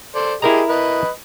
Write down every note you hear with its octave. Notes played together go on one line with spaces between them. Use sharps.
A4 C5 D5
E4 G4 G#4 A#4 D#5 A#5
B4 D#5